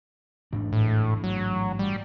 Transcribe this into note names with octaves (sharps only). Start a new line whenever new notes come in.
A1 G#2 D4
A2
F#3
G3